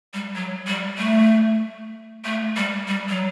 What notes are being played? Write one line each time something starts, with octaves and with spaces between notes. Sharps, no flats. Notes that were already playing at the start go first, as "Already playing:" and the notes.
G3
F#3
G3
A3
A3
G3
G3
F#3